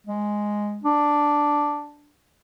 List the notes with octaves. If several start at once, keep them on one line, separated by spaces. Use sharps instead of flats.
G#3
D4